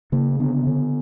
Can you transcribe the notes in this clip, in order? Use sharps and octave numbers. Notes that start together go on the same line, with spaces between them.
C#3 A#3
D3 B3
D3